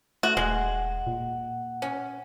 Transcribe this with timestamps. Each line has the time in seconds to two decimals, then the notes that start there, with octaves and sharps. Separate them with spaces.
0.23 A3 F#4
0.37 D#1 G#3 F#5
1.07 A#2
1.82 C#4